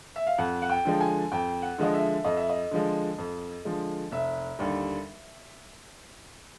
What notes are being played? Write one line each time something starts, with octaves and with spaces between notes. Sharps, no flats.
E5
F5
F2 F#5
F#5
G5
D3 F3 G#3
G#5
F2 G5
F#5
D3 F3 G#3 D#5
E5
F2 D#5
E5
D#5
D3 F3 G#3
F2
D3 F3 G#3
F1 E5
D#2 D3 G3